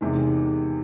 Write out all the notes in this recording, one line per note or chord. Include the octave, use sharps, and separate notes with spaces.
E2 C3 D#3 G#3